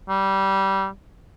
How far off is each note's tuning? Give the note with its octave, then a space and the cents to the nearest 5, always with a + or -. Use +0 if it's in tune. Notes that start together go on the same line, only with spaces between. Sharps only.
G3 -15